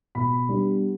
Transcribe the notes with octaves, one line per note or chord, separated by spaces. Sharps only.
B2 B5
G3 B3 D4